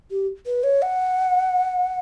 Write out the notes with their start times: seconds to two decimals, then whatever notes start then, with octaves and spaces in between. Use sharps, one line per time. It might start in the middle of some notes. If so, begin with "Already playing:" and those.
0.11 G4
0.46 B4
0.64 C#5
0.82 F#5